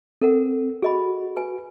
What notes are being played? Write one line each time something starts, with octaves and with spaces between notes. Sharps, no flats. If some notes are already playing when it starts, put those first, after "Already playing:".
C4 A4 A#4 F#5
F#4 G#4 D#5 B5
B4 G#5